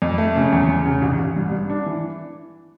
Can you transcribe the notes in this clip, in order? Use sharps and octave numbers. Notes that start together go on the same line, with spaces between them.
F2
A3
C#3
E2
E2
C#3
A1
A1
G2
G2
D4
E3